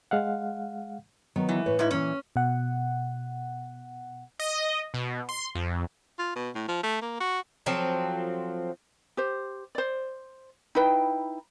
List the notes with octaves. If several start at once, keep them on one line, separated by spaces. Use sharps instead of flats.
G#3 F5 F#5
D#3 F#3 B3
E3
A2 B4 C#5
G#2 E4
A#2 E3 C#4
B2 F#5
D#5
B2
C6
F2
F4
B2
A2
F3
A3
A#3
F#4
F3 F#3 C4 A4
G4 C5
C5 D5
D#4 E4 B4 G5